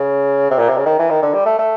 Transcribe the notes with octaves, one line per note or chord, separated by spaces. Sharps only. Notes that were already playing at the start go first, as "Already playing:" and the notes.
Already playing: C#3
C3
A#2
C3
C#3
D#3
E3
D#3
D3
G3
A3
A3